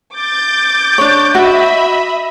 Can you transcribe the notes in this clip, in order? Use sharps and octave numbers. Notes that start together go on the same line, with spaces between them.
D6 G6 A6
D4 C#5
F#4 D#5 E5 B5